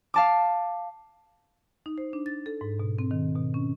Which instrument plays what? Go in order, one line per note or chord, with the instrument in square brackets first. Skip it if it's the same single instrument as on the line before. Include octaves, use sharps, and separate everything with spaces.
[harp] F5 A5 D6
[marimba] D#4
C5
D4
A6
A4
G#2
B2
C4
D#3
B2
C#4